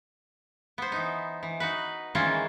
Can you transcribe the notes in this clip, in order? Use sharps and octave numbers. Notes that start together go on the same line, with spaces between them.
B3 C5
E3 D#4
E3
D#4 F#4 B4
D#3 E3 G#3 A#3 C#4 F4